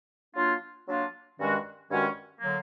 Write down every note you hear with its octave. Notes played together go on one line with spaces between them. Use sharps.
F#3 A#3 D4 F4
F#3 A#3 D4 F4
G2 D#3 G#3 C#4 F#4
G2 D#3 G#3 C#4 F#4
D3 F#3 A#3